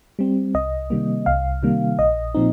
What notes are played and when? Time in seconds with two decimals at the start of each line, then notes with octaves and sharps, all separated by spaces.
0.19 G3 C4
0.54 C2 D#5
0.90 C3 D#3 G3 A#3
1.26 C2 F5
1.63 C3 D#3 G3 A#3
1.99 A#1 D#5
2.35 A#2 F3 C4 D#4